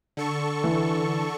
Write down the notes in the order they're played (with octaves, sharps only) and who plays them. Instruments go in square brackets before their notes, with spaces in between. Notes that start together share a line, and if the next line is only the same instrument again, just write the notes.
[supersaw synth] D3 A4 C#6
[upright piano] E3